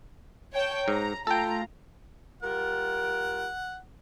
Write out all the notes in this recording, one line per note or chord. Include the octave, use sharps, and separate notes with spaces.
C#5 G5 A5
G#2 A#5
A3 F4 A4 G5 A#5
G3 F4 A#4 F#5